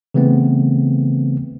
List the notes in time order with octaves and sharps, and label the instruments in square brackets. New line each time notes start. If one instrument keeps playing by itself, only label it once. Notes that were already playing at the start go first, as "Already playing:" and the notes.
[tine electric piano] C#3 E3 A3 B3 C4